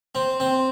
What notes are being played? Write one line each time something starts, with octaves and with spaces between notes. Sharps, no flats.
C4
C4